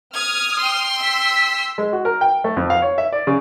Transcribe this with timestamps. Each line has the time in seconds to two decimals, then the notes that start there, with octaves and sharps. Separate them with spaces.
0.14 D#6 F6 G#6
0.59 G5 C6
1.00 E6 B6
1.78 G#3
1.93 F#4
2.05 A#4
2.21 G5
2.44 A3
2.57 F2
2.70 F5
2.82 C#5
2.98 E5
3.13 D5
3.27 C#3